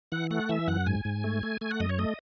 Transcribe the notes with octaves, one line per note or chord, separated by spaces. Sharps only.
E3 F#5
A3 F#5
E3 E5
F#2 F#5
G#2 G#5
G#2
A3
A3
A3 G#5
F#5
F#2 D#5
C#5
A3 D#5